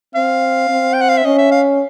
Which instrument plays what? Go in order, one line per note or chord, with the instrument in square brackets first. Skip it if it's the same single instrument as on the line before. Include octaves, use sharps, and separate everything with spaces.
[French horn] C4 [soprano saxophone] F5
[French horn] C4
[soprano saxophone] G5
F#5
F5
E5
[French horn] C#4 [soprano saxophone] D#5
[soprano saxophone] E5
F5